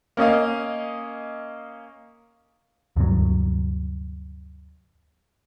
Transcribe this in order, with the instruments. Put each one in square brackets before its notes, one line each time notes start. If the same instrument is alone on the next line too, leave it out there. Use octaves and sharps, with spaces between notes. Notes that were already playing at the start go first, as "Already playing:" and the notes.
[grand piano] A#3 C#4 D#5 F5
[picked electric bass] D2 G2 C3 F#3